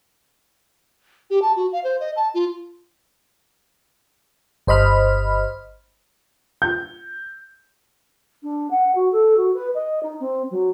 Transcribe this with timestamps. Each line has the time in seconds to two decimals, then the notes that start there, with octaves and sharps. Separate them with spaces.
1.30 G4
1.42 A5
1.56 F#4
1.72 F5
1.84 C5
2.00 D#5
2.16 A5
2.34 F4
4.67 G1 C5 D#5 B5 F6
6.62 G6
8.43 D4
8.71 F#5
8.95 F#4
9.12 A4
9.37 F#4
9.54 B4
9.75 D#5
10.03 D#4
10.20 C4
10.51 F#3